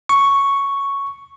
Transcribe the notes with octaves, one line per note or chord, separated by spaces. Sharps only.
C#6